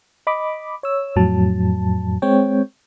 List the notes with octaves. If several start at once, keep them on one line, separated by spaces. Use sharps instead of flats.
D#5 B5 D6
C#5 E6
F2 A2 F#3 A5
G#3 C4 C#5 G5